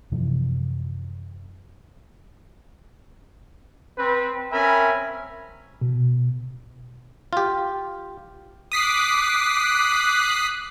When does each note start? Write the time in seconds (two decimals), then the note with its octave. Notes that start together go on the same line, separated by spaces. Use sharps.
0.12 F#2 C3 E3 F3
3.98 C4 B4
4.52 C4 C#4 A#4 E5 G#5 B5
5.81 B2
7.33 F4 G4
8.72 D6 D#6 F#6 B6 C7